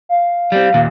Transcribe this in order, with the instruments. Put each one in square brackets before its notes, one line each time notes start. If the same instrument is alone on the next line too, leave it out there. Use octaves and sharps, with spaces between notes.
[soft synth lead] F5
[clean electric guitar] G3 C4
D#2 A#2